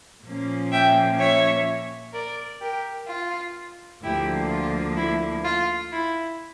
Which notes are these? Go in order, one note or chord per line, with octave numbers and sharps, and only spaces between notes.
A#2 F3 A#3 C#4
E5 G5
C#5 E5
A#4 D5
G4 A#4
F4
D2 D3 F3 A#3 E4 G4
F4
E4
F4
E4